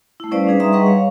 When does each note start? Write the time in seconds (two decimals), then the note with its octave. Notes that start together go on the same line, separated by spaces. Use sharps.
0.20 A3 E4
0.31 G3 C#4 B4 C5 D5 F5
0.47 D4 D#4 G#4 B4
0.60 G3 E5 A#5 C6 D#6
0.73 G3 G#4 B4 D#5 F#5 C#6
0.86 C#5 F5